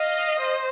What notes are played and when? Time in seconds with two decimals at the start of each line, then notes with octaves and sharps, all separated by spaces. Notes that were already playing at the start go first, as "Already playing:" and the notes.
Already playing: D#5 F5
0.40 C5